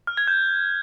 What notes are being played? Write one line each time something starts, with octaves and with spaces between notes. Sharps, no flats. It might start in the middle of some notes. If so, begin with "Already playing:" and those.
F6
G#6
G6